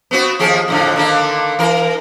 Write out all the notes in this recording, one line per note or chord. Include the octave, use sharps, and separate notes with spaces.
B3 C4 F#4
D#2 F3 G#4
F2 A2 D3
D3 D#3 A#3
E3 A#4